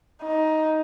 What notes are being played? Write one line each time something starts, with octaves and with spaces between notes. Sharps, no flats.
D#4